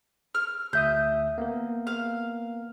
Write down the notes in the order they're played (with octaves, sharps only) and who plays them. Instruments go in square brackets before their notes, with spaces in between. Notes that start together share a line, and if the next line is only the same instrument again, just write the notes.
[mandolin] F6
[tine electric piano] D2 E5 D#6 [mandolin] G6
[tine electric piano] A#3 B3 A#4
[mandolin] F5